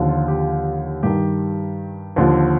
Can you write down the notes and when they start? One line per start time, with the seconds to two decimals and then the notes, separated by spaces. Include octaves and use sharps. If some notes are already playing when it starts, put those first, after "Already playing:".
Already playing: D#2 D3 F3
0.08 F4
0.28 G4
1.03 G2 D#3 G4
2.16 D#2 D3 F3